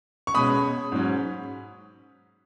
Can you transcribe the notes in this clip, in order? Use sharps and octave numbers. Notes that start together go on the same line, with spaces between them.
C#6
B2 G#3 C#4 B5 D#6
G#2 F#3 C#4